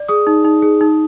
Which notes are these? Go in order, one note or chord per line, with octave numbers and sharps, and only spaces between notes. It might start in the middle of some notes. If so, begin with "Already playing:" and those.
Already playing: D5
G#4 D#6
D#4
D#4
G#4
D#4